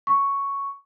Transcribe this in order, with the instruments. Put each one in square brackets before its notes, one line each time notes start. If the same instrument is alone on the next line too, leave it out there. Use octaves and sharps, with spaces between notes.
[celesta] C#6